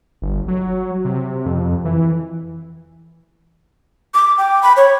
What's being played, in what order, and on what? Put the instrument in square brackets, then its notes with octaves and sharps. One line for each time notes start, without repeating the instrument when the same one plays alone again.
[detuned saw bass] G1
F#3
C3
F2
E3
[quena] D6
G5
B5
C#5